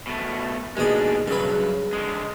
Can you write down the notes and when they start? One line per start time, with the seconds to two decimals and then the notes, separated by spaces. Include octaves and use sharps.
0.07 B2 A3
0.77 D#2 B2 G#3 D4 G#4
1.28 G2 C#3 F#3 B4
1.93 D3 G#3